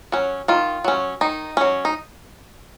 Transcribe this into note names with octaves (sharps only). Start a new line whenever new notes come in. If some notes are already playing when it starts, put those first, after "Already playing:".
F#3 C#4
D#3 F4
F#3 C#4
D#3 D#4
F#3 C#4
D#4